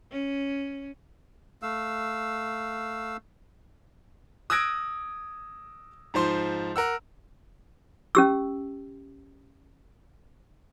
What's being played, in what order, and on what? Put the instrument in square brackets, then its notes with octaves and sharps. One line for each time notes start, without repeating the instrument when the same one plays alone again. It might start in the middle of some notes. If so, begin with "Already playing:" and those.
[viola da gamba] C#4
[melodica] A3 F5 E6
[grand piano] D#6 E6 F#6 G#6 A#6 D7
G#2 F3 C5 C6
A#4 F#5 E6
[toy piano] C#4 G4 E6